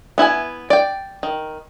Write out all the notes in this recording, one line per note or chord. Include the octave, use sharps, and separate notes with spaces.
B3 E4 E5 G#5
D5 G5
D#3